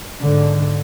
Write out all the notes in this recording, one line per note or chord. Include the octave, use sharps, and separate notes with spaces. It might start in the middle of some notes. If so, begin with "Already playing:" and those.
G#2 D3